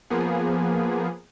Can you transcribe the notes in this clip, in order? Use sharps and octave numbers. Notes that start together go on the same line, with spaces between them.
F3 A#3 B3 G#4